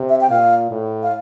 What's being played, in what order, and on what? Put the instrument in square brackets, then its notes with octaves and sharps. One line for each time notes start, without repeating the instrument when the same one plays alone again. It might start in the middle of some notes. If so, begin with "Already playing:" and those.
Already playing: [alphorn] C3
[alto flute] E5
G5
[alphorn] A#2 [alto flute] F5
[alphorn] A2
[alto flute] F5